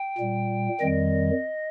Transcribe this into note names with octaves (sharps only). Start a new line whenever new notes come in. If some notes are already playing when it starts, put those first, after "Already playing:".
Already playing: G5
A#2 G3
F2 D#3 G3 D#5